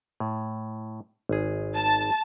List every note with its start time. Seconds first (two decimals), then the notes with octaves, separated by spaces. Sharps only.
0.20 A2
1.29 G#1 G#4
1.76 A5